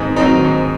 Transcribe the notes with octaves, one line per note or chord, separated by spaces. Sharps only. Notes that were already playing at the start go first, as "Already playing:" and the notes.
Already playing: G#2 D#3 C4 D#4
D#3 F#3 C4 D#4
G#2